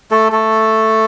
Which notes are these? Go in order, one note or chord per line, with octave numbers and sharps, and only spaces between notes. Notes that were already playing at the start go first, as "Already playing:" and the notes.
A3 A4
A3 A4